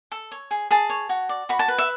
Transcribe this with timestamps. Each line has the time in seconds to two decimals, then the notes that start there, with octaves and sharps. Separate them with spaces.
0.12 A4
0.32 C#5
0.51 G#4
0.71 G#4 A5
0.90 C#5
1.09 F#4
1.29 D5
1.49 F#4 B5
1.59 A5
1.68 B4
1.78 E5